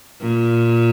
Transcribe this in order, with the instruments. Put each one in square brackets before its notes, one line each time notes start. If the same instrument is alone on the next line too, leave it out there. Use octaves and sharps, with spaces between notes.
[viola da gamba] A#2